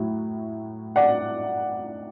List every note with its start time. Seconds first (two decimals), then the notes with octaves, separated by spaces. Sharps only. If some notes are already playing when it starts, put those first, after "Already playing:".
Already playing: A2 F#3 E4
0.96 D5 F#5